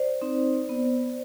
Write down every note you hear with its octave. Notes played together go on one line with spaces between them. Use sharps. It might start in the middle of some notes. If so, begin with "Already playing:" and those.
Already playing: C5 D5
C4 D#4
B3